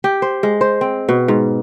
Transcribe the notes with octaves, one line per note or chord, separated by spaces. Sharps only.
G4
C5
G#3
C5
C4
B2
G#2